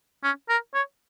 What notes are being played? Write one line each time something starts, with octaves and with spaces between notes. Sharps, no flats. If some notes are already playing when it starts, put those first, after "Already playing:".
C#4
A#4
C#5